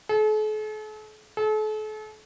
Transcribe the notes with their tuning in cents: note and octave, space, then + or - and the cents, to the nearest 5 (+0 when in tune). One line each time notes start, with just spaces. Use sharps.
A4 -45
A4 -40